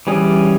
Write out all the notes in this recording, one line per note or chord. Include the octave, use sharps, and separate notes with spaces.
E3 G3 C#4 G#4